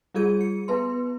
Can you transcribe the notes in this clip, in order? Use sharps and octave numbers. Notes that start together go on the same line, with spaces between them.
G3 F4 G#4 G#6 D#7
C#7
B3 B4 C6